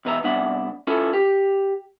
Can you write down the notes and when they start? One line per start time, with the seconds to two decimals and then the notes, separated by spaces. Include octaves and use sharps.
0.05 E2 B2 B4 E5 A#5
0.24 C2 B3 D4 E5 F#5
0.87 C#4 E4 F4 A4 B4
1.13 G4